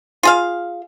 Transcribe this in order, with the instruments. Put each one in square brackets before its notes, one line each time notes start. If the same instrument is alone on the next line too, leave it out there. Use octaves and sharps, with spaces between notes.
[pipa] F4 G#4 F5